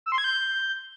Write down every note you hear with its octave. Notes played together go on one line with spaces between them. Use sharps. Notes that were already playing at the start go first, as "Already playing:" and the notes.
E6
C6
G#6
G6